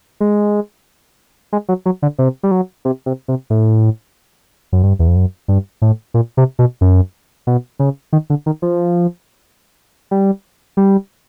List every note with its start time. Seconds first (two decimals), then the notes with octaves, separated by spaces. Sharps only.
0.20 G#3
1.53 G#3
1.69 F#3
1.86 F#3
2.02 D3
2.19 C3
2.43 G3
2.51 F#3
2.85 C3
3.06 C3
3.28 C3
3.50 A2
4.73 F#2
4.83 G2
4.99 E2
5.08 F2
5.16 F#2
5.48 G2
5.82 A2
6.14 A#2
6.37 C3
6.59 B2
6.81 F#2
7.47 B2
7.79 C#3
8.13 D#3
8.30 D3
8.46 D#3
8.62 F3
10.11 G3
10.77 G3